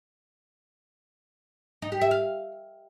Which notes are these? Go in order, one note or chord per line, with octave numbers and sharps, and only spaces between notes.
D#4
G4
E5
F5